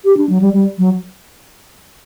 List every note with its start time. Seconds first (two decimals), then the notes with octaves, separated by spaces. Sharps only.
0.05 G4
0.17 D4
0.29 F#3
0.41 G3
0.54 G3
0.78 F#3